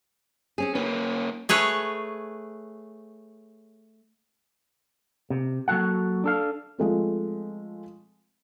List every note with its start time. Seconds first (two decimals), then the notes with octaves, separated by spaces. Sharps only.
0.58 C4 C#4 G#4
0.75 A#3 C#4 B4
1.49 A3 G#4 B4 C#5
5.30 C3
5.68 F#3 A#3 F#4 A4 F#5
6.24 D4 A4 F5
6.78 F3 G#3 A3 C4